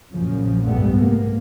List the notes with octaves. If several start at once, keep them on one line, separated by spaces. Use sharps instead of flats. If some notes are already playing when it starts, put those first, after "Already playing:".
A#1 F#2 A#2 C#3 F3
C2 G#2 G3 A3 B3
A#3